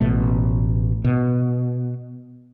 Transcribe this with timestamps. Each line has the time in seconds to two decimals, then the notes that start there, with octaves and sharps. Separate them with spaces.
0.01 A1 B2 A3
1.04 B2